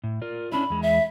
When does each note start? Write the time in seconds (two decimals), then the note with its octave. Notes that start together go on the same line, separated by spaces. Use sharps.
0.04 A2
0.22 F4 A#4 D5
0.52 C#4 D4 E4 B5
0.70 E2 G#3
0.83 E5